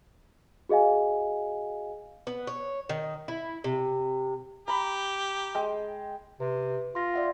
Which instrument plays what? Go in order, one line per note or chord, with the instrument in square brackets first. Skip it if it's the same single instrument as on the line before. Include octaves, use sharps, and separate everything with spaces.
[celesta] F#4 G#4 D#5 F5 G#5
[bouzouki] B3
C#5
D#3
E4
C3
[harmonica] G4 [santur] A#5 B5
[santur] G#3 G5
[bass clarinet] C3 [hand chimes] B4
[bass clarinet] F4 [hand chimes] C6 A#6
[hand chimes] D5 E5 F#5